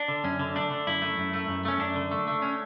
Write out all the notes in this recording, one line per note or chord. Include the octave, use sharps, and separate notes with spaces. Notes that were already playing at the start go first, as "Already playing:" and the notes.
Already playing: D4
D3
F#2 C#4
D3
A3 D4
D3
F#2 E4
A3
F#2
A3
F#2
A3 C#4
F#2 D4
D3
A3
A3
C#4